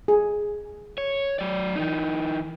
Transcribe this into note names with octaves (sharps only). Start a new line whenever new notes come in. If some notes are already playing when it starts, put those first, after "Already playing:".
G#4
C#5
F#3 D5
E3 D#4